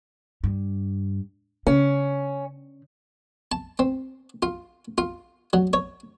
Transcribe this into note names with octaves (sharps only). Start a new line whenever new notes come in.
G2
C#3 C#4
A5
C4
F4
F4
F#3
C#5